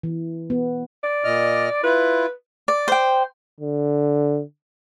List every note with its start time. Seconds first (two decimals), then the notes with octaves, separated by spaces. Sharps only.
0.03 E3
0.50 B3
1.04 D5
1.24 A#2 D#5 F6
1.83 E4 F4 B4
2.68 D5
2.88 C5 G5
3.61 D3